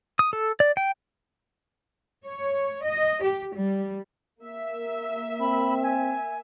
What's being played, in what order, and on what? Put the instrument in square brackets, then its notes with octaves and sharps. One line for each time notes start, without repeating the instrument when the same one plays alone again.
[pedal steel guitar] D#6
A4
D5
G5
[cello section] C#5
D#5
G4
G3
[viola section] A#3 E5
[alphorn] C4 [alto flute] B5
[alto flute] G#5